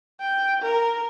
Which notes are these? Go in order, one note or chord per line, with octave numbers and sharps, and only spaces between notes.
G5
A#4